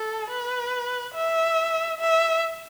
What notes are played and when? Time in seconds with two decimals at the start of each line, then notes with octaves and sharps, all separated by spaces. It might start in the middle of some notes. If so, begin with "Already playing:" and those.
Already playing: A4
0.30 B4
1.14 E5
2.00 E5